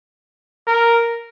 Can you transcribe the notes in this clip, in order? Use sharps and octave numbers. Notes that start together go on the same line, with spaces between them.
A#4